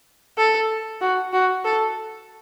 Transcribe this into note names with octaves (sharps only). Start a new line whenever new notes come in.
A4
F#4
F#4
A4